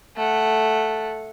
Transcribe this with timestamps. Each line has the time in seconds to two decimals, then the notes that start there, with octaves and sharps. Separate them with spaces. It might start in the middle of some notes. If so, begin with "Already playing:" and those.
0.16 A3 F#5